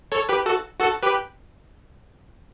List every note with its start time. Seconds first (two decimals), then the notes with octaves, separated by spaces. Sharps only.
0.12 A4 C#5
0.29 G4 B4
0.46 F#4 A4
0.80 F#4 A4
1.03 G4 B4